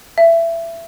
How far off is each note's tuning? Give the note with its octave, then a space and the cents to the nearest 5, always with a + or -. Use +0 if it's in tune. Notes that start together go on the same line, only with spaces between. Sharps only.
E5 +20